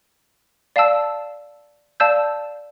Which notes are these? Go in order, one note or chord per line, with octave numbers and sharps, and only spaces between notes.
D5 F5 A5 E6
D5 F5 A5 E6 G6